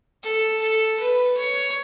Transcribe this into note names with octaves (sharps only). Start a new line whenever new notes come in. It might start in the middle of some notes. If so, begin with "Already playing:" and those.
A4
A4
B4
C#5